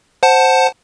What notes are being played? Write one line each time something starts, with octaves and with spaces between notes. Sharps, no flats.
C5 F#5 A5